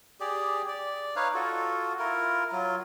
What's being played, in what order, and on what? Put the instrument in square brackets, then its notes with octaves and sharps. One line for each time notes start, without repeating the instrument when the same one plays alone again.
[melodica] G4 G#4 D5
D5
D#4 B4 C#5 F5
F4 F#4 A4
E4 F4 A#4
F#3 F4